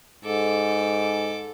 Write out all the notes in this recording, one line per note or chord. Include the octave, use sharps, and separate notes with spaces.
G#2 A4 D6